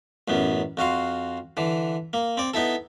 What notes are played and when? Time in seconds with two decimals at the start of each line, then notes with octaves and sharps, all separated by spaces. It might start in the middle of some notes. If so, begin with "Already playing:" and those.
0.28 A1 F#2 B3
0.77 F2 F#4 F5 C6
1.57 D3 E3
2.13 A#3
2.37 C4 D5
2.54 B3 D#4 E4 A4